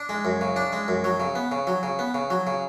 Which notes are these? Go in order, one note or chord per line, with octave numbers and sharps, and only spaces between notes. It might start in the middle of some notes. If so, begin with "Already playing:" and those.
Already playing: D4
G#3
F#2
C#3
D4
G#3
F#2
F#3
C#3
B3
C#3
F#3
C#3
B3
C#3
F#3
C#3